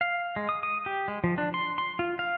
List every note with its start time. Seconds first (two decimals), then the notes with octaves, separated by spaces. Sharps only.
0.01 F5
0.36 G#3
0.49 D#6
0.63 D#6
0.86 G4
1.08 G#3
1.24 F3
1.38 D4
1.54 C6
1.78 C6
1.99 F4
2.19 F5